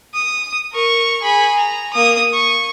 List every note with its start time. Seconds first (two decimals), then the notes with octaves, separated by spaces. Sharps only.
0.14 D#6
0.73 A#4 C#6
1.22 G#4 B5
1.58 A#5
1.93 A#3 D#6
2.33 C#6